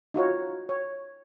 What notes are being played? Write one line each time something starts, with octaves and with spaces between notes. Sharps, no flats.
D#4 F4 F#4 C#5
C#5